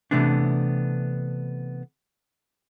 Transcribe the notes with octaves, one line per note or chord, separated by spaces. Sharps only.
C3 E3 A3 B3 D4